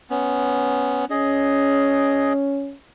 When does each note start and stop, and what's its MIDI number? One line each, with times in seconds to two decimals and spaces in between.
0.10 1.05 59
0.10 1.05 61
1.10 2.73 61
1.10 2.33 68
1.10 2.33 75